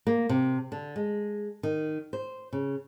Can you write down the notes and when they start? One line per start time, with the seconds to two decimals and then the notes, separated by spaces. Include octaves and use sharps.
0.07 A#3
0.29 C3
0.72 D3
0.96 G#3
1.63 D#3
2.13 C5
2.53 C#3